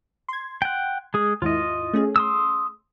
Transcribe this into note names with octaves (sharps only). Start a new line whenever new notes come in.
C6 G#6
F#5 G5
G#3 G#4
D#2 G#2 E4 F4 D#5
A3 C#4 G#4
C6 D#6 E6